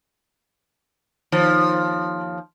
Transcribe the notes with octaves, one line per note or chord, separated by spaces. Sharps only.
D#2 F3